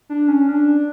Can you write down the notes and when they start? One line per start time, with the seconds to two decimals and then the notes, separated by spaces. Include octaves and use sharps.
0.09 D4
0.28 C#4
0.49 D4